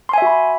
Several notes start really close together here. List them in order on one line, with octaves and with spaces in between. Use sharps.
C6 G#5 E5 F#4 B5